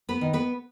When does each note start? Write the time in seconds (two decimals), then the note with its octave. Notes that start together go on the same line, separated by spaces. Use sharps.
0.09 B3 B4
0.21 D#3
0.33 B3 B4